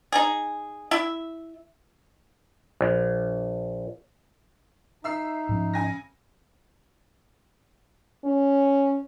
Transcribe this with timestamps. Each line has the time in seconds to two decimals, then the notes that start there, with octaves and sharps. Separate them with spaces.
0.12 D#4 G#4
0.91 E4 E5
2.81 A#1
5.04 D#4 E5 E6 C7
5.49 G#2 F3 C#4
5.74 C#3 G#5 A#6
8.24 C#4